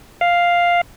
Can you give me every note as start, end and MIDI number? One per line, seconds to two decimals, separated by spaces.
0.21 0.81 77